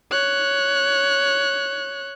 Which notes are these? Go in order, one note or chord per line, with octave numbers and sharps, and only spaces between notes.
C#5 F#6